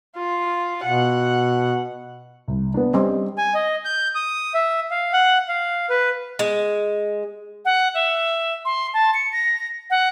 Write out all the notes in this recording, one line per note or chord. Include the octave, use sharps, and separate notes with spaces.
F4
B2 F#5
C2
B3 D4
G3 C4 C#4 D#5 C6
G#5
D#5
G6
D#6
E5
F5
F#5
F5
B4
G#3
F#5
E5
C6
A5
C#7
A#6
F#5